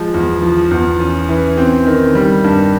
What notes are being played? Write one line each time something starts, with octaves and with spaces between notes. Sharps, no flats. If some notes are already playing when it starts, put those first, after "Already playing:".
Already playing: F3 G#3
E2
F3
E2
C#4
E3
C4
D#3
G3
G2